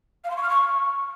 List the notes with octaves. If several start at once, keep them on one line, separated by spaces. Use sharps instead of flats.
F5
C6
C#6
F6
C#6